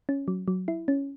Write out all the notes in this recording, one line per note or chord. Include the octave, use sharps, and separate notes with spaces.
C#4
F#3
F#3
E4
C#4